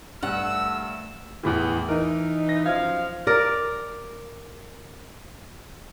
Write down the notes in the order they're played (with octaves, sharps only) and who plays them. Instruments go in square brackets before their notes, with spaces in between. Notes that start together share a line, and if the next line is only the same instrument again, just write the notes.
[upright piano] G2 [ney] A3 [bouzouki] F#5 [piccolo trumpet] E6
[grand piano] E2 A2 E3
[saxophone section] E3 D#4 [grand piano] A#4
[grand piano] A#6
[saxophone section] F#2 F3 F5 [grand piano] G#6
[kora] A#4 D5